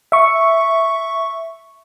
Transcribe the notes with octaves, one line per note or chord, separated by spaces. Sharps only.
E5 C#6